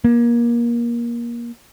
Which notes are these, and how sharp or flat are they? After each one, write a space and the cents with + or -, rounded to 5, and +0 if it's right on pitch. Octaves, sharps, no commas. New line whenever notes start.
A#3 +25